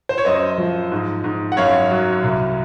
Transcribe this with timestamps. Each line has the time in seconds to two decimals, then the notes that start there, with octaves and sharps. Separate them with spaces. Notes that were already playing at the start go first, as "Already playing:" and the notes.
0.09 C5
0.18 C#5
0.25 F#2 C5 D#5
0.58 F3
0.92 G#2
1.24 G#2
1.52 F#5
1.57 F#2 C#5 F5
1.91 F#3
2.23 C2